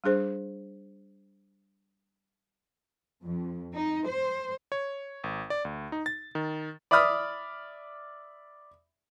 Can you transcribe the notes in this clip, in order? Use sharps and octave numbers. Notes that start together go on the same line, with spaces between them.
G3 D4 G#4 C5
F2
D#4
C5
C#5
G#1
D5
D2
D#4
A6
D#3
D5 E5 B5 D#6 F6